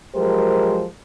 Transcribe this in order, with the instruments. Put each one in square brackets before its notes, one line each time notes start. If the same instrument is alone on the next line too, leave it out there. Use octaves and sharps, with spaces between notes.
[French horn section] F3 F#3 G#3 G4 A#4 C5